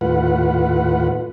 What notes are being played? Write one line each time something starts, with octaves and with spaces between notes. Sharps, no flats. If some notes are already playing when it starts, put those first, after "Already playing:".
D#2 A2 F4 B4 F#5